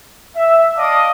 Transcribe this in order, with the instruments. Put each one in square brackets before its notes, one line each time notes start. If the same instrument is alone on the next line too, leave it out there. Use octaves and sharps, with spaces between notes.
[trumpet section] E5
D5 D#5 F5 A5 D6 D#6